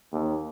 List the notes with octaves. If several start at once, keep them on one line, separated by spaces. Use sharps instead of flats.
D#2